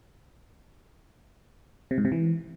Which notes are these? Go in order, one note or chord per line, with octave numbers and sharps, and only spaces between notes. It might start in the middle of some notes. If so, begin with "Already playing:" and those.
C3
G#2
C3
E3